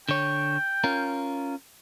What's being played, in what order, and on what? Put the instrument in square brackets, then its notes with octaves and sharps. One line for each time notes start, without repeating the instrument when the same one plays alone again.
[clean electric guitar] D3 C#5 [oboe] G5
[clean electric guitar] C#4 F4 A#4